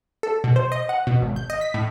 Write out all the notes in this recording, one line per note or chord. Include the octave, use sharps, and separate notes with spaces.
A4
B2
C5
D#5
F#5
B2
G#1
G6
D#5
B6
A2